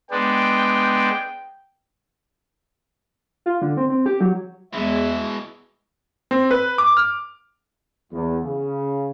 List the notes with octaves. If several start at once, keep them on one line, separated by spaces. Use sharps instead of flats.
G#3 B3 D4 G5
F4
D3
C4
C4
G4
F#3
E2 B2 E3 G#3 E5
C4
B4
D6
F6
E2
C#3